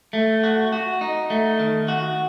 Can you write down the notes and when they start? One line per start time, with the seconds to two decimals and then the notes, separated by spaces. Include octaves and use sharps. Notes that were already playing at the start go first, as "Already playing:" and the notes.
0.13 A3
0.44 F#4
0.73 F#4
1.01 D#4
1.30 A3
1.59 D#3
1.88 F#4